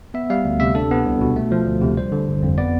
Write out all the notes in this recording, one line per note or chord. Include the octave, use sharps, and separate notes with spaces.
B3 E5
G3 F5
D2
C3 E5
D4 A4
B3
C2
B2
A3
F3
D2
C3
G3 C5
D3
G1
F2
B3 D5